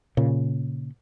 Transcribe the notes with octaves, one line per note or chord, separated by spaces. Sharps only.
A#2 C#3